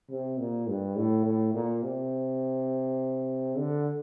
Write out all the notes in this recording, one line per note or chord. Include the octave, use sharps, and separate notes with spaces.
C3
A#2
G2
A2
A2
A#2
C3
D3